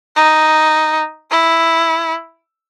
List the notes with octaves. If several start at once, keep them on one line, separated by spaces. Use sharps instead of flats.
D#4
E4